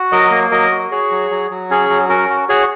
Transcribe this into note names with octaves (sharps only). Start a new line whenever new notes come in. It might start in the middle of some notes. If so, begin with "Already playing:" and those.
Already playing: F#4
F#3 A#4 D#5
A#3
F#3 A#4 D#5
F#4
F#4 G#4 C#5
F#3
F#3
F#3
C#4 G#4 C#5
F#3
C#4 F#4 A#4
F#4
F#4 G#4 C#5